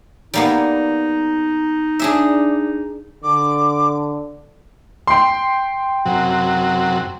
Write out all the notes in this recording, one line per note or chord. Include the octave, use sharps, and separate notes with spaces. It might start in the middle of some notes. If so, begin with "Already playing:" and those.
G3 A#3 B3 D#4
D4 G#4 E5
D3 D6
G5 C6
F#2 C3 F#3